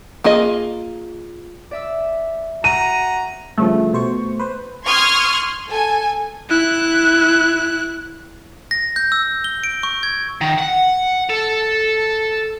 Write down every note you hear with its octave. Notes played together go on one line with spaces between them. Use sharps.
A#3 F4 G#4 D#5
D5 E5 E6
F#4 A#5 D#7
G2 C#3 F3 A3
B2 C5 C#6
B4 C5
C6 C#6 D#6 F6 G#6
A4 G#5
E4 F#6
A#6
G6
E6
G7
D7
C#6
G#6
D#3
F#5
A4